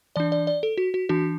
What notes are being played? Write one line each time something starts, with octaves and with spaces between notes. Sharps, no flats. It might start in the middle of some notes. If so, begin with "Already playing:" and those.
E3 D4 D5
D5
D5
A4
F#4
F#4
E3 D4 F#4